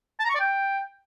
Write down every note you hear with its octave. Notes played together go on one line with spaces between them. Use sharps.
A5
A#5
C#6
D5
G5